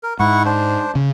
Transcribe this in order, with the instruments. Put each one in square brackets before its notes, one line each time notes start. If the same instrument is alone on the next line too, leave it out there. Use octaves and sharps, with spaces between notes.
[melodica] A#4
[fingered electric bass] G#2 [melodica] E4 F#5 C#6
[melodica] D4 C5
[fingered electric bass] C#3